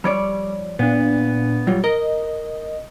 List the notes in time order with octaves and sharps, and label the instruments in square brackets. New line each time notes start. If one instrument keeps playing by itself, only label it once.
[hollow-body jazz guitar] F3 C#5 D5 [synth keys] G3
[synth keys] A#2 D4 [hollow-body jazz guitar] B3
[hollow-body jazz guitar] F#3 G3 F4
[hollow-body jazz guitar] A#4 [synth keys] D#5